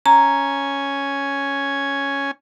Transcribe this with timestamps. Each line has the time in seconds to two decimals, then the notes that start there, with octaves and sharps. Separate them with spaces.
0.06 C#4 G#5 A#5